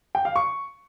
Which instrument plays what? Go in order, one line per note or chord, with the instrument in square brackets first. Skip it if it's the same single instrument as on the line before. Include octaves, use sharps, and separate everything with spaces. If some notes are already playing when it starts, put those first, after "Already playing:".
[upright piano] G5
F5
C#6